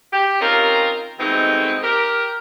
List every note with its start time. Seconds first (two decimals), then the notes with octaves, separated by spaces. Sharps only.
0.13 G4
0.41 C4 C#4 D#4 F4 G4 A#4
1.19 D#2 B2 G#3 A3 C4 D#4
1.83 G4 A#4